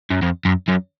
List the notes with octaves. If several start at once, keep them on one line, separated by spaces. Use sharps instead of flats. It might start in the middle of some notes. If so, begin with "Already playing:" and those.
F#2
F2
F#2
F#2